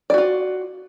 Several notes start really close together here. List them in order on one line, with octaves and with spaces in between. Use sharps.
D5 F#4 F4